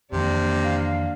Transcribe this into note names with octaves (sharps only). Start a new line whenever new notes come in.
F2 C3 D#3 E3 A#3 D4
F5